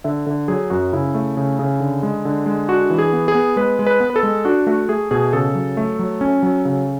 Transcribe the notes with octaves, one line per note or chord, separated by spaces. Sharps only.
D3 E5
D3
F#3 G#4
F#2 F#4
C#3 E4
A3
C#3
C#3
D3
G#3
D3
G#3
D4 F#4
E3
G#4
B3
G#4
B3
G#3 B4
G#3
B4
B3
B4
A4
G#3
D4 F#4
A3 F#4
A3 G#4
B2 G#4
C#3 A4
F#3
A3
F#3
C#4
F#3
C#3